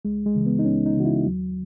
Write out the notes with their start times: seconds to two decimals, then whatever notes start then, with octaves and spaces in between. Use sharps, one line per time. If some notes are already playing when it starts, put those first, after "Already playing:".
0.05 C#2 G#3
0.26 G#3
0.35 C#3 E3
0.46 B3
0.59 D#4
0.65 C#2 C#4
0.86 D#4
0.96 C#3 E3 F#4
1.05 E4
1.25 D#2 F#3